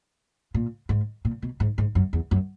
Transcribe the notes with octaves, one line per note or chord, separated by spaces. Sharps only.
A#2
G#2
A#2
B2
G#2
G#2
F#2
E2
F#2